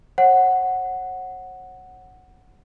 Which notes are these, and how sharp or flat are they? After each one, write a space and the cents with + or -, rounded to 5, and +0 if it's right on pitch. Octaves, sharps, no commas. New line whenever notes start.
C#5 -45 F#5 +0